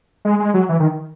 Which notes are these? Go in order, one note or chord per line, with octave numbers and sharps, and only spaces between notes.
G#3
G#3
F#3
E3
D#3